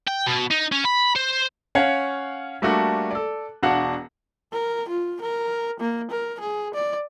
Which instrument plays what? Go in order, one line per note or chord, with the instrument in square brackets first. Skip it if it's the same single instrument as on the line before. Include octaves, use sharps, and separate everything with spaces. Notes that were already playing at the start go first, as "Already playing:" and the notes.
[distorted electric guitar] G5
B2
D#4
C#4
B5
C5
[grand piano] C#4 C#5 F5 F#5
G3 A3 A#3 D4 F#4
A4 D5
E1 D4 F#4 F5 F#5
[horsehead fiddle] A#4
F4
A#4
A#3
A#4
G#4
D5